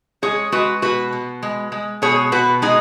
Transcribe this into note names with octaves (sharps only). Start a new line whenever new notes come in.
G#3 G#4 C#5
G#3 F#4 B4
B2 F#4 B4
B2
G#3
G#3
B2 G#4 C#5
B2 F#4 B4
G#3 D#4 G#4